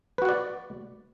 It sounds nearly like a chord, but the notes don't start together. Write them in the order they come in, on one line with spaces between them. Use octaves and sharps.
B4 F#4 F#5 D5